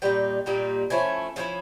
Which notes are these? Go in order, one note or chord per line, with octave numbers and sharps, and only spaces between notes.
A#2 G3 D#4 G5
A#2 G3 A#3 D#4
F3 A3 C#4 E4 G#5
F3 A3 C#4 E4